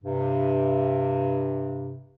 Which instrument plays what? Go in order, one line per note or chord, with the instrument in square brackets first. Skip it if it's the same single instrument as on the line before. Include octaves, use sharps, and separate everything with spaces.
[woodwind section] G2 C3